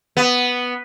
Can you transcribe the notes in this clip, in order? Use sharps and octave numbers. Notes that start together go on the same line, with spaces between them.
B3